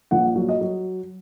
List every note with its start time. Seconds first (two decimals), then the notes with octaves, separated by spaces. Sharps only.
0.11 A#1 F#5
0.36 F#3
0.49 D#5
0.61 F#3